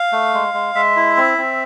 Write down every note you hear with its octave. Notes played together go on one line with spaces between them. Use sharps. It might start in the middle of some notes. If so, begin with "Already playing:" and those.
Already playing: F5
A3
G#3
G#3
G#3 E5
E4
C4
C4